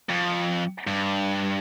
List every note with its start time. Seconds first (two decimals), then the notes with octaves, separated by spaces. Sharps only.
0.10 F2
0.87 G2